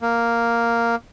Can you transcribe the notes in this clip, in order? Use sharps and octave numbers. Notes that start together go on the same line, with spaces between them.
A#3